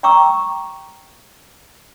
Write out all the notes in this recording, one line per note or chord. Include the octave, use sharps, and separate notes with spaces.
G5 A#5 C#6 D6 E6